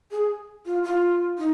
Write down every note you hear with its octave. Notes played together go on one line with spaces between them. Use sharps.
G#4
F4
F4
D#4